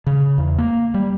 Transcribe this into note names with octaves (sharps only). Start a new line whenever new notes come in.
C#3
E2
A#3
G3